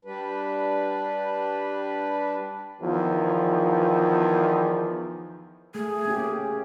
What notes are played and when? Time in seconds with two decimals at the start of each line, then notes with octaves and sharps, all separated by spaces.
0.05 G3 D4 B4
2.81 E2 D#3 F3
5.75 A3 G#4
6.05 A#3 C#4 G4
6.17 C#4